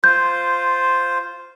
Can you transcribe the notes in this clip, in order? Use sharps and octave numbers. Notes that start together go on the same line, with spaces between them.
F4 C5 G6